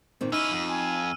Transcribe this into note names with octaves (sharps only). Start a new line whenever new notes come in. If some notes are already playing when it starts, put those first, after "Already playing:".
A#2 D#3 C4
C#4 D#4 E4 E6 F6 D#7
F2
G#5